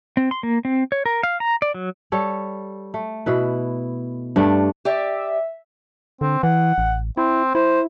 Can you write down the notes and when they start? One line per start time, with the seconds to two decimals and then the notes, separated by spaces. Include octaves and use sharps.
0.17 C4
0.31 C6
0.43 A#3
0.65 C4
0.92 C#5
1.06 A#4
1.23 F5
1.40 A#5
1.62 D5
1.74 F#3
2.12 G3 A4 C#5
2.94 A3
3.26 B2 E4 B4
4.36 G2 A3 D4
4.85 G4 D5 E5
6.21 D3 C4
6.43 E3 F#5
6.78 A1
7.17 C4 E4
7.55 E4 C5